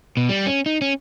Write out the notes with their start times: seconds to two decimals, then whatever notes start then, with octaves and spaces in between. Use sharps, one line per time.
0.17 B2
0.29 G3
0.46 C#4
0.66 D#4
0.82 C#4